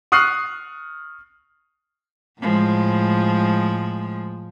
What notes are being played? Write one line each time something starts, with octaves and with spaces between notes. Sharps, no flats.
C#6 D#6 F6 F#6 C7
A2 F3 G#3